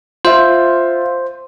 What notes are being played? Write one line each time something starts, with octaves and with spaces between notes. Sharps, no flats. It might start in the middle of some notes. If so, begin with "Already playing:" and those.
F4 C5 E5